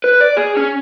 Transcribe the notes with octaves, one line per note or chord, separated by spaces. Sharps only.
B4
D5
G#4
C#4